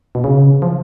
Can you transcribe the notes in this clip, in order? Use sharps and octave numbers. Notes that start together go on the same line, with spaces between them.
B2
C#3
F3